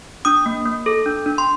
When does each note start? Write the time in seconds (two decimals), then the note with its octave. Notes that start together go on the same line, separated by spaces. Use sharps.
0.25 D4 D#6
0.46 A#3
0.65 A#3
0.86 A4
1.06 D4
1.26 D4
1.38 C6